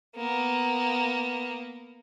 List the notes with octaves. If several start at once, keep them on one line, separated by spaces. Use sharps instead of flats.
A#3 B3